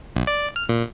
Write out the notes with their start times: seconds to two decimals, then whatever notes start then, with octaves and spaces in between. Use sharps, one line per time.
0.16 B1
0.27 D5
0.56 F6
0.69 A#2